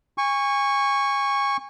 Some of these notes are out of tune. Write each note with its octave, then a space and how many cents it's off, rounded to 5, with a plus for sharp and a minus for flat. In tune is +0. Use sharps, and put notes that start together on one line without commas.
G#5 -30 C#6 +0